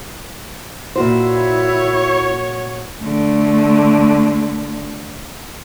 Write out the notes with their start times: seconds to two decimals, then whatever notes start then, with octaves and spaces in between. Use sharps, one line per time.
0.96 A#2 E4 F#4 C5
1.30 C#5
3.01 D3 A3